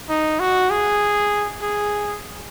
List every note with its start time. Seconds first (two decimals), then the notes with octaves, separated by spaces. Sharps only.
0.09 D#4
0.40 F#4
0.70 G#4
1.62 G#4